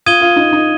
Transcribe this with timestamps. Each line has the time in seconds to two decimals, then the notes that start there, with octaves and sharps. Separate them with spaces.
0.06 F4 D#6 G#6 D#7 G7
0.21 F4
0.36 D#4
0.53 D#4